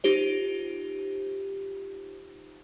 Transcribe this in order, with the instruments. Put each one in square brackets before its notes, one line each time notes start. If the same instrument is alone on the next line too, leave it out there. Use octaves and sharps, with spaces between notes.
[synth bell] D#4 F4 G4 C5